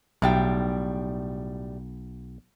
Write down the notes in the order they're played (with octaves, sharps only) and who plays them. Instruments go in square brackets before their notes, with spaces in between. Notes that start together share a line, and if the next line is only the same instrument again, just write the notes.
[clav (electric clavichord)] B1 [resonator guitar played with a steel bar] A2 G3 G5